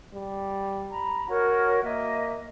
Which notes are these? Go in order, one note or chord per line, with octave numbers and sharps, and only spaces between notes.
G3
A#5 B5
F#4 A#4 C#5
A#3 D#5 E5